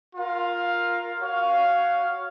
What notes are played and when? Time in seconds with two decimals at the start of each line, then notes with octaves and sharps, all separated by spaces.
0.16 F4 A#4 F5
1.19 F#4 C#5 F5